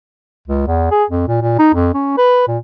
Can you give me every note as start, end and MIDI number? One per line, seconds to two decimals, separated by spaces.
0.47 0.62 37
0.67 0.90 40
0.91 1.04 68
1.10 1.25 41
1.27 1.37 46
1.41 1.55 46
1.59 1.69 63
1.74 1.92 41
1.94 2.13 61
2.17 2.45 71
2.48 2.58 46